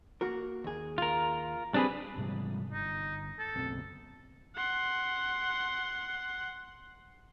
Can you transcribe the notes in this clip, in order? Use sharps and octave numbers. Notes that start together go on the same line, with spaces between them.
A#3 F#4 A#4
D#2 G#4
F4 A#4
G3 C4 D4 G4 G#4 B4
G#2 C3 G3
G1 D#4
A4
F#1 B1 C4
F#5 C6